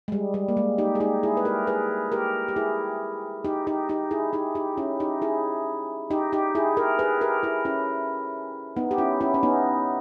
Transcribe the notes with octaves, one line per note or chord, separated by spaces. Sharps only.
G#3
G3
G3
A#3
G#3
D#4 G4
G#4
D#4 G4
E4 G#4
B4
G4 A#4
G#4 B4
G4 A#4
G4
E4 G#4
D#4 G4
D#4 G4
D#4 G4
E4 G#4
D#4 G4
D#4 G4
C#4 E4
D#4 G4
E4 G#4
D#4 G4
D#4 G4
E4 G#4
G4 A#4
G#4 B4
G4 A#4
E4 G#4
C#4 E4
B3 D#4
G4
C#4 E4
C#4 E4
C#4
B3 D#4